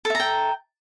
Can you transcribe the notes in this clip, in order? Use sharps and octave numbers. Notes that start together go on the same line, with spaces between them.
A4 E5 G5 A#5